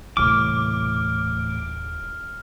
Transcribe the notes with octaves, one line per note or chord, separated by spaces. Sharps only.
D#1 A2 C3 E3 D6 F6